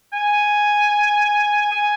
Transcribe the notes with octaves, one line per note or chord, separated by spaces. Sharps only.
G#5
G#5